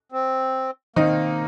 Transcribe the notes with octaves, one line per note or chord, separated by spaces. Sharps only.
C4
D#3 A#3 C4 D#4